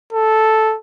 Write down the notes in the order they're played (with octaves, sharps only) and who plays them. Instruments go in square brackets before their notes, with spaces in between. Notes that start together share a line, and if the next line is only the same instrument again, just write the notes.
[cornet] A4